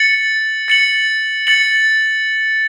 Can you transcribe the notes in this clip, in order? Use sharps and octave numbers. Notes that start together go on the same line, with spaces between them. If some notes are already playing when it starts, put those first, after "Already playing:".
Already playing: A6 C#7 F#7
A6 C#7 F#7
A6 C#7 F#7